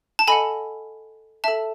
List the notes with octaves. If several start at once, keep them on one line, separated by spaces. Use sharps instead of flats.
A5
A4 D#5 F#5 G#5 B5
A4 E5 A5